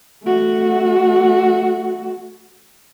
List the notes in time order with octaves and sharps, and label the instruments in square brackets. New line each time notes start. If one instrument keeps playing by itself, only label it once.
[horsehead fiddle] A3 F#4